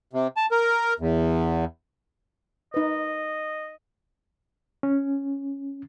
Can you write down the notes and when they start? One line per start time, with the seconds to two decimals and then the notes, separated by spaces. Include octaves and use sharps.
0.13 C3
0.37 A5
0.52 A#4
1.00 E2
2.74 D#4 B4 D#5
4.83 C#4